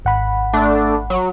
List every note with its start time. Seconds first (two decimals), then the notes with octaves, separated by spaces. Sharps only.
0.05 G#1 F#5 B5
0.53 A3 D4
1.10 F#3